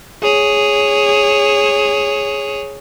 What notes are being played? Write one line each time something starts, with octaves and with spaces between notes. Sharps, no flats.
G#4 C#5